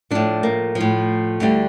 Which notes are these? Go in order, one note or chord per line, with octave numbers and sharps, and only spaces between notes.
A2 F3 D4
A#3
F3
A2
D2 D3 G3